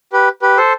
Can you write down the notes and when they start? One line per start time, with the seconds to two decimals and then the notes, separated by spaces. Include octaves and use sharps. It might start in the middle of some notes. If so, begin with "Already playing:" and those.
0.13 G4 B4
0.42 G4 B4
0.57 A4 C5